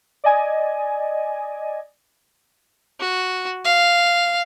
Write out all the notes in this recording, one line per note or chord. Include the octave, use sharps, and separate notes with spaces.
D5 D#5 G#5
F#4
F5